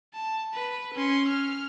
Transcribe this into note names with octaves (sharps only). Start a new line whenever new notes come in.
A5
B4
C#4 C6
F6